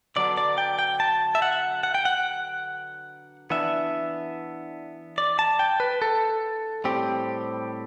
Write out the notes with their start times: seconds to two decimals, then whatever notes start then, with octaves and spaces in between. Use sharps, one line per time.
0.16 D3 F#3 B3 D4 D5
0.37 D5
0.58 G5
0.79 G5
1.00 A5
1.35 E5
1.42 F#5
1.83 F#5
1.95 G5
2.05 F#5
3.50 E3 B3 D4 E5
5.18 D5
5.39 A5
5.59 G5
5.80 B4
6.02 A4
6.84 A2 G3 C4 G4